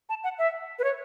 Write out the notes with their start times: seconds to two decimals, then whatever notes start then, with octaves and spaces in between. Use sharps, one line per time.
0.09 A5
0.24 F#5
0.39 E5
0.79 B4
0.84 C#5